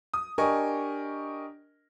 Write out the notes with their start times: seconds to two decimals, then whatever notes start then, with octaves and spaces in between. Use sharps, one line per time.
0.14 D#6
0.38 D4 G4 A#4 D#5 G#5 C#6